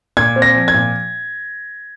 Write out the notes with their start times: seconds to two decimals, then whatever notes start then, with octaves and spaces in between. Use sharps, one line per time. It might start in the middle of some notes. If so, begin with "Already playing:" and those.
0.17 A#2 G#6
0.36 C4
0.42 A#6
0.55 F3
0.68 G#6
0.74 A#2